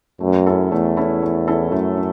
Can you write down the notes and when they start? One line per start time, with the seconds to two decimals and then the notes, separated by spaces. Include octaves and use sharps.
0.20 F#2 A3
0.47 C#4 E4 A4
0.72 E2 A3
0.97 C#4 E4 A4
1.22 A3
1.48 C#4 E4 A4
1.72 F#2 A3
1.97 C#4